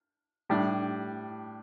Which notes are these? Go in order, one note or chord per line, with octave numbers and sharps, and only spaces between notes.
A2 G3 D4